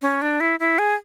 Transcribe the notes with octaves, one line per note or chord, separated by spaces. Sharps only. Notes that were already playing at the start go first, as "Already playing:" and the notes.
C#4
D4
E4
E4
G#4